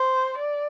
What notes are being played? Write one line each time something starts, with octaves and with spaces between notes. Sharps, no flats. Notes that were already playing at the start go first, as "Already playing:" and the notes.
Already playing: C5
D5